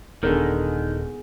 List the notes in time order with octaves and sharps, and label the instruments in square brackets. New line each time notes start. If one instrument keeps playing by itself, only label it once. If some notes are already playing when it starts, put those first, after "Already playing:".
[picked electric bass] D#1 [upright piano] D3 A#4 [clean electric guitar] D#3 [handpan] B3 G#4